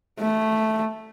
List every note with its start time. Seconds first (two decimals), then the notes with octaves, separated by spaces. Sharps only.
0.20 A3